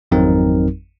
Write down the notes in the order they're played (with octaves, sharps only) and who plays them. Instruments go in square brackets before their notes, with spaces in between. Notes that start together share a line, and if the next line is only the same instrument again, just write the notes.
[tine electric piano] G#1 F2 F#3 C4 D#4 A#4